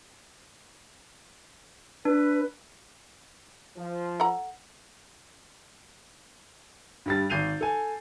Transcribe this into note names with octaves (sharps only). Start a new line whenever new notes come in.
D4 B4
F3
A4 F#5 A#5
G2 G3 A6
G#1 G6 C7 D#7 F7
A4 G#5